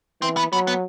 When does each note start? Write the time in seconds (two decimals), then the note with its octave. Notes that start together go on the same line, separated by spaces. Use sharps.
0.21 E3 C4
0.37 B3
0.52 F#3 B3
0.67 B3